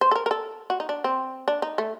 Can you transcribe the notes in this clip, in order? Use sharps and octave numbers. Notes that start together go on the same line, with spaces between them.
C5
A4
A#4
A#4
A4
F#4
D#4
D4
C4
D4
D#4
A3